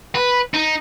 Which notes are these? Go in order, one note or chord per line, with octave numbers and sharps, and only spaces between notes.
B4
D#4